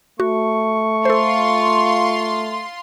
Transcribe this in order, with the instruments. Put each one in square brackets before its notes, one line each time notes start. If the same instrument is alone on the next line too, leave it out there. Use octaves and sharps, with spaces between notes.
[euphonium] A3 [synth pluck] F#4 [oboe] C#6
[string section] F4 C6 [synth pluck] A4 C5